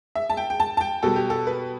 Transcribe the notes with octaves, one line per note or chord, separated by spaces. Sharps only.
E5
A5
G5
G5
A5
A5
G5
B2 G3 A4
G4
A4
B4